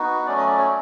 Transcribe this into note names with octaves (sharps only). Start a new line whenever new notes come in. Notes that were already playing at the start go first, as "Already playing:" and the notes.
Already playing: B3 D#4 F#4
F#3 A3 C#4 D5
D#5
D5
C#5